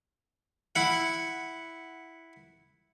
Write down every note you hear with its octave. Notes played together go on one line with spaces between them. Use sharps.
E4 F#5